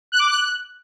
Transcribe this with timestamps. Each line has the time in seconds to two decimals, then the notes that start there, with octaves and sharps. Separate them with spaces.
0.12 F#6
0.19 D6
0.27 F#6